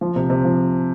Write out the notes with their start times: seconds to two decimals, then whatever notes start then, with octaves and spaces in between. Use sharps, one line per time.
0.01 F3
0.16 C3
0.30 C3
0.45 F3